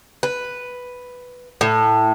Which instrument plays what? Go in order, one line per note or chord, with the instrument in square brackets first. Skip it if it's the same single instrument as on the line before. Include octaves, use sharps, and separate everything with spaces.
[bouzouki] B4
A2